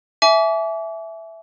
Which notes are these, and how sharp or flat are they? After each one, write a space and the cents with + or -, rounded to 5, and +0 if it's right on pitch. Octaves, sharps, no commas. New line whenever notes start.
E5 +0 G#5 +35 D6 -35